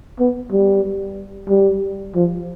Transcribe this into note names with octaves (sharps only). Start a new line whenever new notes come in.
B3
G3
G3
F3